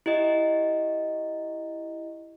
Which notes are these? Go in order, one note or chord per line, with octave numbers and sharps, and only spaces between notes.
E4 G4 D#5